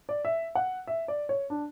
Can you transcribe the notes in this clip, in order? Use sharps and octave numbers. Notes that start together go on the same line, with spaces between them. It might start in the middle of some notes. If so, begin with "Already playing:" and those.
D5
E5
F#5
E5
D5
C#5
D4